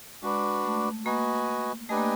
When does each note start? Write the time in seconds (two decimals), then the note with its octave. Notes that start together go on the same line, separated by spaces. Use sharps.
0.23 G#3 D4 F#4 B4 D5
0.64 A3
1.05 A#3 F#4 B4 D#5 G#5
1.89 A3 D4 G4 B4 D#5 G#5
1.97 A#3